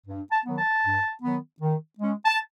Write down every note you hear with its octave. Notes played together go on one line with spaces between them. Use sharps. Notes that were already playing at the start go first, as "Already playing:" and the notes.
G2
A5
D#3 F#3 B3
A5
G2
D#3 F#3 B3
D#3
G#3 C#4
A5